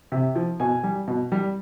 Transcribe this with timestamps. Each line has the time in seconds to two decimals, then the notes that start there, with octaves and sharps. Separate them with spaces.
0.12 C3
0.35 F3
0.60 B2 G#5
0.83 G3
1.08 B2
1.32 G3